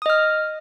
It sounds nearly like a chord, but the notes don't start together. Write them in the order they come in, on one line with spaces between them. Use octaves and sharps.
D#6 D#5 F6